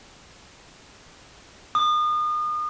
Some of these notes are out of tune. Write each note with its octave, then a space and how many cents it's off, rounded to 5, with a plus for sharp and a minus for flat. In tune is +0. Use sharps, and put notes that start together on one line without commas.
D#6 -35